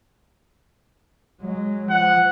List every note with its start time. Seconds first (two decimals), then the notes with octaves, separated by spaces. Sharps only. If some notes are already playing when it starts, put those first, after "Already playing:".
1.41 F#3 G#3
1.90 F3 F#5